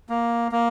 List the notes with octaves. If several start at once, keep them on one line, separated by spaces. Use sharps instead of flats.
A#3
A#3